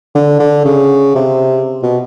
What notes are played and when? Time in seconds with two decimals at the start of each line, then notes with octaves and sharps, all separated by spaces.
0.15 D3
0.40 D3
0.65 C#3
1.15 C3
1.83 B2